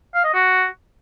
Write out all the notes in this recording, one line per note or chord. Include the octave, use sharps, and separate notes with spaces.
F5
D#5
F#4